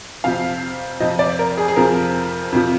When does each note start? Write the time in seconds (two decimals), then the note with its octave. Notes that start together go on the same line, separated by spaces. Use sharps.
0.24 F2 C3 F3 F5
1.00 F2 C3 F3 D#5
1.19 D5
1.39 A#4
1.57 G#4
1.68 G#4
1.76 F2 C3 F3 A#4
2.52 F2 C3 F3